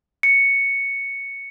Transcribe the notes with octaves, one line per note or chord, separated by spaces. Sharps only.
C#7